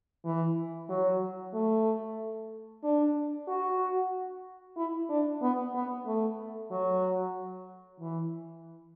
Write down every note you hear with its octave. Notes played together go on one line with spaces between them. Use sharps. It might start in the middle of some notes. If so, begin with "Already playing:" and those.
E3
F#3
A3
D4
F#4
E4
D4
B3
B3
A3
F#3
E3